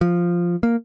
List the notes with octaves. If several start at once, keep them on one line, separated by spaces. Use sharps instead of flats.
F3
A#3